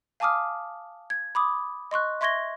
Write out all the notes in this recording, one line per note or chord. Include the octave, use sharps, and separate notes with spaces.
F5 G#5 A5 D6 D#6 F6
G#6
B5 D6 D#6
D#5 C6 C#6 F#6
E5 C6 C#6 G#6 A#6 G7